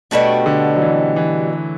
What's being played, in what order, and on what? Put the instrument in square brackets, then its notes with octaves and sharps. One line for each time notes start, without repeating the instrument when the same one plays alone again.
[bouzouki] B2 G3 D4 F#4 [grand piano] A3
[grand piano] D3
F#3
E3
E3